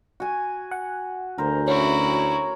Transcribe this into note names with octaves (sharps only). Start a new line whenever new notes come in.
F#4 G#5
F#5
D2 A#4 C5
C#4 E4 F#4
C#5 A#5